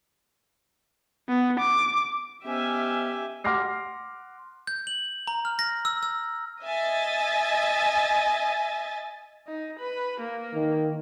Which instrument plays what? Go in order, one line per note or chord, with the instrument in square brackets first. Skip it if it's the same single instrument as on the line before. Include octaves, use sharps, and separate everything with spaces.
[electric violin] B3
D6
[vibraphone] B3 C5 D#5 [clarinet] C#4 [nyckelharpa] G4 G#5 [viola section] E5
[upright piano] F#5 C6 D6 F6 A#6 C7
[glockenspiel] G6
F#7
A#5
F6
A#6
E6
E6
[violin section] D#5 E5 G#5 A6
[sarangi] D#4
B4
A#3
[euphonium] D#3